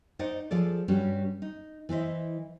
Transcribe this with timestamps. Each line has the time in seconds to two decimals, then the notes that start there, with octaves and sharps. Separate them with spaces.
0.19 D#4 C5 D5 D#5 F#5
0.51 F3 G#4 A4 D5
0.88 G2 G3 C#4 F#4
1.42 D#4
1.89 E3 E4 C5 D#5